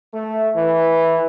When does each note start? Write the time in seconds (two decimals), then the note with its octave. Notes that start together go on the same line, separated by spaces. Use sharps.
0.12 A3
0.55 E3